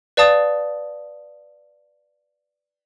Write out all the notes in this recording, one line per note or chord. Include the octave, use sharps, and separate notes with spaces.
B4 D5 F5 A5 D#6 A6